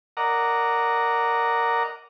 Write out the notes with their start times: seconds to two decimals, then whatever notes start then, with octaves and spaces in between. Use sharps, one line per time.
0.17 A#4 D5 D#5 F#5 A#5